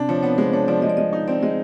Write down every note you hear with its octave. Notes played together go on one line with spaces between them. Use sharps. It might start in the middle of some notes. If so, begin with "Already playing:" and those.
Already playing: C3 D4
F3 C#5
B3 C#5
G#3 C5
D4 C#5
F3 D5
G#3 D#5
D5
G#3 D#5
D#4
C4 D5
G#3 D#5